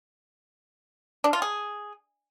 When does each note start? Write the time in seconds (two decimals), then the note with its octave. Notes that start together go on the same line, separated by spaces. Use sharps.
1.24 D4
1.33 F4
1.42 G#4